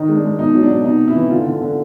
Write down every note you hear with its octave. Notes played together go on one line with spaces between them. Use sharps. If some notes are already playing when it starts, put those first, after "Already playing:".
Already playing: D#3 D#4
G#3
D4
G#3
B2 D#4
F#3
D4
B2
C3 D#4
C3
E4
E3
D3 F4
D3
D3